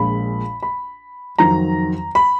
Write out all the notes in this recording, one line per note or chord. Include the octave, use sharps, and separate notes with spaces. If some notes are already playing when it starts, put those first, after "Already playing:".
Already playing: A#1 A#2 G#3 B5
B5
F2 D#3 F#3 A#5
B5